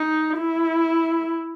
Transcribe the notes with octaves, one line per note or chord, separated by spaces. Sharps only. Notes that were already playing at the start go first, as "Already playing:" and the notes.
Already playing: D#4
E4